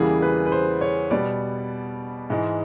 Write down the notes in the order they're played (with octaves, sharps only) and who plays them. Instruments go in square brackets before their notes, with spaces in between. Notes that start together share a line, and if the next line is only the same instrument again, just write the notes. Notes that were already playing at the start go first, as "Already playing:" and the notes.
Already playing: [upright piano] E2 C#3 E3 G3 A#3 G#4
B4
B4
C5
C#5
B2 G3 B3 D5
G#2 E3 G#3